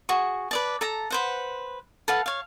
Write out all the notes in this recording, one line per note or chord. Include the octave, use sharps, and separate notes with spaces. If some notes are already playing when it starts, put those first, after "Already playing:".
F#4 G#4 C#6
B4 D5 A5
A4 A5 A#5
B4 C5 F#5
A4 B4 F5 F#5
C#5 F5